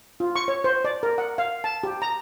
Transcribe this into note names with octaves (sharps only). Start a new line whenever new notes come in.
F4
C#6
C#5
C5
D5
A#4
F#5
F5
A5
G4
A#5